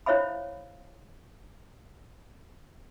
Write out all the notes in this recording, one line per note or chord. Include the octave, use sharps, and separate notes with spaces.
E4 C5 C#5 E5 F5 B5